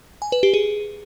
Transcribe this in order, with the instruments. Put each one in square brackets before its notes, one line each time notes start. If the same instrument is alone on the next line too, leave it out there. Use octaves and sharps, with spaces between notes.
[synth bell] G#5
B4
G4
G#4